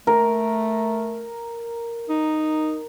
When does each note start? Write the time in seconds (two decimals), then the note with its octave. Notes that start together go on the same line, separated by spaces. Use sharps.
0.07 A3 A#4
2.09 D#4